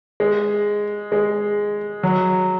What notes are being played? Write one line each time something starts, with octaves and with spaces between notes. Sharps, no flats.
G#3
G#3
F#3